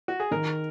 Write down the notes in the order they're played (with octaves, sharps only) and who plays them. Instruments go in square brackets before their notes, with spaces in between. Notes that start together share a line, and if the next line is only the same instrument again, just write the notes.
[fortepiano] F#4
G#4
[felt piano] D#3 [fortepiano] A#4